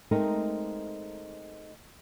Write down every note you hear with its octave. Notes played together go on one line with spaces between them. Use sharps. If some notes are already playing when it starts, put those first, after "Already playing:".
G#3 A3 C4 D#4 A#4